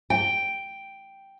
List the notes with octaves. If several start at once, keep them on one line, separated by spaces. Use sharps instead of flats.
G5